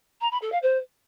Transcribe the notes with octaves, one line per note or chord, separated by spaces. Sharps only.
A#5
B5
A4
F5
C5